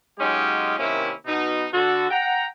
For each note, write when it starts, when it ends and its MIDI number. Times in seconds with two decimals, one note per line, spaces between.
0.19 0.77 54
0.19 0.77 56
0.19 0.77 61
0.19 0.77 63
0.19 0.77 65
0.19 0.77 67
0.79 1.13 48
0.79 1.13 51
0.79 1.13 58
0.79 1.13 61
0.79 1.13 64
1.26 1.66 47
1.26 1.66 63
1.72 2.09 50
1.72 2.09 66
1.72 2.09 69
2.11 2.47 78
2.11 2.47 79
2.11 2.47 82